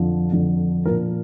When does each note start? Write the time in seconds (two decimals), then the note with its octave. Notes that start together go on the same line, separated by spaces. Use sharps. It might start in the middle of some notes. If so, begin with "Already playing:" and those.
Already playing: F2 D3 F3
0.32 F2 D3 F3
0.86 A#2 F3 A#4